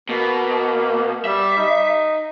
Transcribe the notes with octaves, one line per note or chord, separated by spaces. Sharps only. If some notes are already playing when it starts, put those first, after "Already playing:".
B2 A#3
G3 E5
D#4